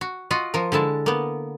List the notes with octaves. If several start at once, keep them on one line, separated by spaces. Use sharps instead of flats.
F#4
F4 F#4 D#5
F3 A#4
D3 G#3 E4 A5
A#3 B3